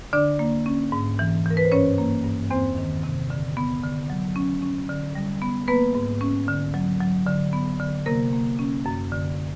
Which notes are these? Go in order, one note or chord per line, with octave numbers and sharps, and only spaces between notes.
D3 D4 D5
A#3
C#4
G#2
E3
E3 A#4
B4
C5
G2 C#4 C#5
A#3
G2
E2 C4 C5
D#3
C3
D3
B3
D3
F#3
C#4
C#4
D3
G3
B3
A#3 B3 B4
G#2
C#4
D3
F#3
F#3
D3
B3
D3
C3 A#3 A#4
A#3
C#4
F#2
D3